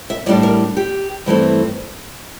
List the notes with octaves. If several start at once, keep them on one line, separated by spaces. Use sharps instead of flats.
E5
A2 G3 D4 D5
A#4
G4
G2 E3 A3 C4